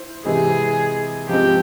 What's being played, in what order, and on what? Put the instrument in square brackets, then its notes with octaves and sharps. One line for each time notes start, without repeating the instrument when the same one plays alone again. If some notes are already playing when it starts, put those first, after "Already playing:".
Already playing: [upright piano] E4 C5
[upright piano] C3 E3 G#3 C4 [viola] G#4
[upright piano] F3 G#3 C4 [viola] G4